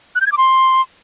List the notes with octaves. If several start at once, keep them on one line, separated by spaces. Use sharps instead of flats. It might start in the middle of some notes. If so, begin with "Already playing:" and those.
F#6
G6
G#6
D6
C6